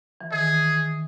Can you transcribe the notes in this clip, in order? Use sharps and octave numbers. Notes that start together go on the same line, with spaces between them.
E3
D#3 G#4